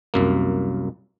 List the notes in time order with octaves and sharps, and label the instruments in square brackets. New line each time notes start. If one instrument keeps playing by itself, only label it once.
[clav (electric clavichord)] C2 F#2 A#3